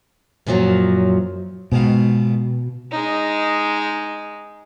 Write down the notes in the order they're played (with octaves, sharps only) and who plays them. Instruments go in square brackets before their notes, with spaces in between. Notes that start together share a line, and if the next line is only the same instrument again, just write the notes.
[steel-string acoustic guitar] F#2 A#2 F3 F#3
[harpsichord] G#2 D#3 F4 [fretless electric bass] B2
[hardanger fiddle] G#3 D#4